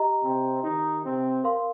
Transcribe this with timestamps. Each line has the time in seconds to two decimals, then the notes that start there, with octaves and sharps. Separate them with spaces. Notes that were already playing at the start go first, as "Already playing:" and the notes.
Already playing: G4 D#5 A#5
0.23 C3 C4
0.63 D#3 D#4
1.05 C3 C4
1.44 A#4 F5 C6